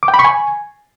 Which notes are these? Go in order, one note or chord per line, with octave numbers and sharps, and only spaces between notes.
D6
G5
B5
C#6
G#5